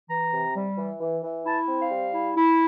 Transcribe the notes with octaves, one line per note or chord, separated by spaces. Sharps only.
E3 A#5
C3
G3
E3
E3
E3
E4 A5
C4
F5
G3
E4
E4